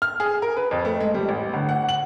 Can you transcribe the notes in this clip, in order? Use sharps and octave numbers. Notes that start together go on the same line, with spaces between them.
F6
G#4
A#4
B4
F2
A3
G#3
G3
A1
G1
F#5
F#7